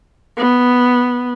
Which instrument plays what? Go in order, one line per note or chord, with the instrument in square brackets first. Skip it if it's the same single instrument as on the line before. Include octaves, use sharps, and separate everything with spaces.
[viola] B3